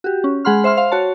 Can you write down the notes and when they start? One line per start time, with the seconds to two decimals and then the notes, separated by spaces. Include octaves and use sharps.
0.04 F#4 G4
0.24 C#4
0.45 G#3 G#4 F#5 B5 C6 F6
0.64 C5 E5 C6 F6
0.77 C5 F5 C6
0.92 F#4 C#5 A5